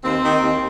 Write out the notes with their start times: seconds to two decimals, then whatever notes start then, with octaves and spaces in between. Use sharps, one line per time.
0.04 D#2 C4
0.23 D#3
0.41 D#2